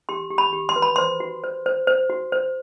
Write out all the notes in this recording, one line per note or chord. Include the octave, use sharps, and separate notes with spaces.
G4 C6
G4
B5
G4
C6
B4
B5
C5 C6
F#4
C5
C5
C5
F#4
C5